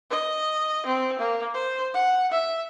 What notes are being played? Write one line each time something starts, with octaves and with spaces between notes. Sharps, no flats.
D#5
C4
A#3
C5
F#5
E5